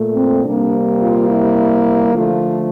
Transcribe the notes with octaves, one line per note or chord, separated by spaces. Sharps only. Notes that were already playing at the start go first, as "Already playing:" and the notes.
Already playing: A#2 A3
C4
C3 G3 A#3 D4
F4
E4
D3 F3 A3 F4